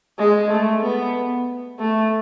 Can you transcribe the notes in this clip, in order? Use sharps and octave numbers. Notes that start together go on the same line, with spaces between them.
G#3
A3
B3
A3